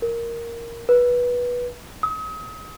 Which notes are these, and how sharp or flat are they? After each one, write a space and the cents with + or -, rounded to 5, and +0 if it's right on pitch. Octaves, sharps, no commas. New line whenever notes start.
A#4 +0
B4 -15
D#6 +40